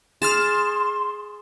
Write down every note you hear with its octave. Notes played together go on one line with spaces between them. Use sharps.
G#4 C6 F6 A6 E7